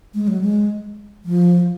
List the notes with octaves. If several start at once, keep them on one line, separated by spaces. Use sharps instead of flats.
G#3
F#3
G#3
F3